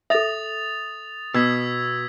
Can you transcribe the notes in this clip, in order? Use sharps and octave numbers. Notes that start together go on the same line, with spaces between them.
A4 E5 D#6 A6 F7
B2 E6 G#6 B6